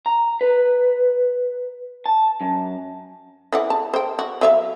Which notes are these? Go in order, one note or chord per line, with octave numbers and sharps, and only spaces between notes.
A#5
B4
A5
F#2
E3 D5 F#5
A5
C5 G5
F#4
F#3 E5 F5